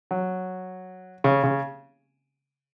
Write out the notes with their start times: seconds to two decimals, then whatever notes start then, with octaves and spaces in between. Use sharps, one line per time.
0.11 F#3
1.24 C#3
1.44 C#3